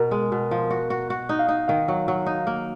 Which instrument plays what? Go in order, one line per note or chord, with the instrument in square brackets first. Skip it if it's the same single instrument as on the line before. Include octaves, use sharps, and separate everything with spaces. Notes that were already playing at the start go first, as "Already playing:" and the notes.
Already playing: [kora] B2 [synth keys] A#4
[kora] G#3
B2
F3
F#4
F#4
F#4
D#4
[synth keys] F5
[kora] D#4
[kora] D#3 [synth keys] F5
[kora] F#3
F#3
D#4
A#3